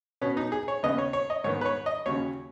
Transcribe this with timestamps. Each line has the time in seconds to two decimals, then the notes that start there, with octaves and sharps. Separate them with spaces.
0.21 B2 B3 C#4
0.37 D#4
0.52 G#4
0.68 C#5
0.83 D#2 C#3 B3 D#5
0.98 C#5
1.13 C#5
1.30 D#5
1.44 G#2 D#3 B3 C#5
1.61 B4
1.65 C#5
1.86 D#5
2.06 D#2 C#3 F#3 C#4 C#5